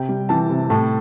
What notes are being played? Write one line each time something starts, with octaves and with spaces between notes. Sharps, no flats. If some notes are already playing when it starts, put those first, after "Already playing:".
Already playing: C3 G5
G3
E3 A5
C3
A2 A5